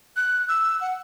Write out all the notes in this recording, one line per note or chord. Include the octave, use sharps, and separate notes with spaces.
F#6
E6
F#5